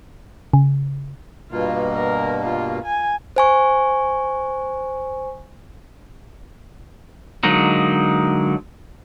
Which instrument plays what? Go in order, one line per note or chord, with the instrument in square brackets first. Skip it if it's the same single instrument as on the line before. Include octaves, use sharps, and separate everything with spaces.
[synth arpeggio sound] C#3
[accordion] G2 B2 A#3 [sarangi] F4
[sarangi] A#4
F4
G#5
[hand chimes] C5 G#5 C#6
[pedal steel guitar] D3 F#3 G#3 A#3 D#4